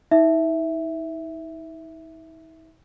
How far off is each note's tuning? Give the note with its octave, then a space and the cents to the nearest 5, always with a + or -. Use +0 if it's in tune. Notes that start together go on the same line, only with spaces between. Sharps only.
D#4 +45 E5 +0